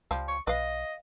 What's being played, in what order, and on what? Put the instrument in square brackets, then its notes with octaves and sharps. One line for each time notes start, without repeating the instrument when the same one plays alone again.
[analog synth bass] C#2 [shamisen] F3 G3 F5
[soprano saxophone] C#6
[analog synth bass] B1 [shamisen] B4 F5 [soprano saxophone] D#5